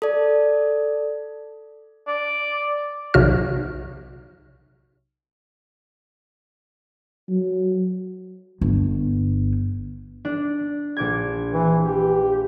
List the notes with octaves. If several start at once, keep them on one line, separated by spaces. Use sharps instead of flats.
A4 D5
D5
B1 C3 F#4 F6
F#3
G1
D4
A#1 D6 G#6
E3
G4